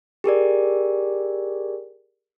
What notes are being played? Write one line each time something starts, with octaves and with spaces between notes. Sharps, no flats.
G4 G#4 A#4 D5